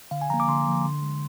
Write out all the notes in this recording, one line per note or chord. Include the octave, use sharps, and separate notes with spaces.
D3 F5
G#5
F3 A#3 A#5
D6
D3 C6
F3 A#3
D3
G#3